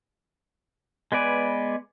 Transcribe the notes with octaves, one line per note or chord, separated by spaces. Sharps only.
G#3 B3 B4 D5 G#5